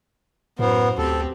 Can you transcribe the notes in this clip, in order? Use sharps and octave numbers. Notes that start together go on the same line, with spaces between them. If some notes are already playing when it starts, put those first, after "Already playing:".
F#2 A2 B3 A#4 C5
D2 C4 G4 A4